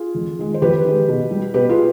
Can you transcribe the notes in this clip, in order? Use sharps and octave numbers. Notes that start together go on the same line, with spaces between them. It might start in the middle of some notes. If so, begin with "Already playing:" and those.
Already playing: F4 G#4
F2
D#3 G#3
C5
F2 G4 B4
D#3 G#3
B2
G3
B2 G4 B4
F4 G#4